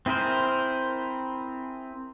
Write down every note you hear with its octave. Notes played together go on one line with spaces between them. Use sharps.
C4 E4 G#4 A#4 C5